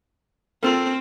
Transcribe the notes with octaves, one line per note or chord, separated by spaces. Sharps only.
C4 F4 A4 A#4